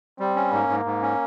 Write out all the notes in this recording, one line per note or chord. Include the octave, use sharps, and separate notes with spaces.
G3 C4
C#4
G#2 A#3
G#2
G#2
C#4